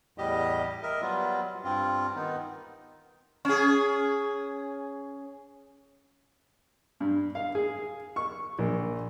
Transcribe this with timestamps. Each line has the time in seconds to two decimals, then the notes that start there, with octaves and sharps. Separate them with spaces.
0.18 E2 A2 G3 G4 D#5
0.83 A#4 D#5 E5
1.02 F#3 G3 B3 F4
1.64 G2 C4 F4
2.15 D#3 B3 D#4
3.45 C#4 G#4
7.00 G2
7.35 F5
7.55 G#4
8.16 C#6
8.58 A#1